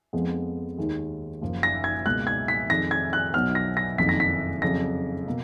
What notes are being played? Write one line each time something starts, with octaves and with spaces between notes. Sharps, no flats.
F2 F3 G#3 B3
D#2 D#3 G#3
F#1 F#2 F3 A#3
A#6
G#6
C#2 B2 A#3 F#6
G#6
B6
F2 D#3 G#3 A#6
G#6
F#6
B1 B2 F#3 B3 F6
A#6
A#6
F#1 F2 D#3 A#3 B6
A#6
B6
F2 C#3 F#3 A#6
B2 A#3